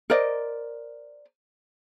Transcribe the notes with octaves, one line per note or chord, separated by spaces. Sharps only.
A#4 C5 D5 D#5